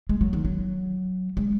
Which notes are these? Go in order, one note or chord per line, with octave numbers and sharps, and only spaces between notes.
G#3
F#3
D#3
F#3
G#3